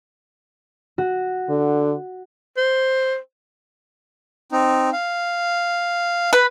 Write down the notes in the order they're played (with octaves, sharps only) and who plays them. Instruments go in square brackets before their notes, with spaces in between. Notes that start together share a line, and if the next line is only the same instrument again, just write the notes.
[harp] F#4
[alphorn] D3
[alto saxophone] C5
[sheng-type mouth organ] C4 D#4
F5
[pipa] B4